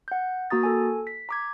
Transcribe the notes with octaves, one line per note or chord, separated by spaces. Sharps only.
F#5 G6
A#3 F#4 A#5 D#6 A6
A4 G#5
B6
A#5 D6 G#6